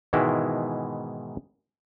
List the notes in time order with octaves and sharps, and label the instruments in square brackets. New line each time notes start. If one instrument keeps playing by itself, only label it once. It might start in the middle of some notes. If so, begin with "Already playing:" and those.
[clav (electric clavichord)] G#2 B2 D#3 E3 G#3 E4